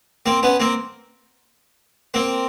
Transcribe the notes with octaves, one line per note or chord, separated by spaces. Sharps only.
A#3 C4
B3 C#4
A#3 C4
A#3 C4